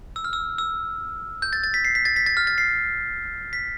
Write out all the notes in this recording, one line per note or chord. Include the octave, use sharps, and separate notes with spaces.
E6
F6
E6
E6
G6
A6
A6
B6
C7
B6
A6
B6
A6
F6
A6
C7
B6